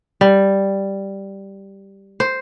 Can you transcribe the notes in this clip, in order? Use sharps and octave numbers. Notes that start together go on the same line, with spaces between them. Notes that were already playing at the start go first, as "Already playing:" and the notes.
G3
C5